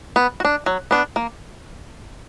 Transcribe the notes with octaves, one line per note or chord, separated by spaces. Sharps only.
B3
F#4
D4
F#3
B3 D4
A#3